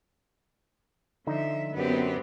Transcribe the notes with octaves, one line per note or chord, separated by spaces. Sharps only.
D3 F3 D#4 E5
F#2 B3 C4 G4